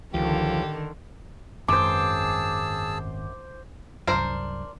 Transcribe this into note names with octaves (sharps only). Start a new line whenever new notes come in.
C#2 D3 D#3 F3 G4
G#1 F#2 G#4 C5 A5 D6 E6
C2 F#2 D4 A#4 C5